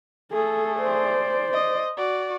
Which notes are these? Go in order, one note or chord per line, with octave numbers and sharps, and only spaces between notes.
A3 G#4 A4
C5 D5
D#5
F#4 D5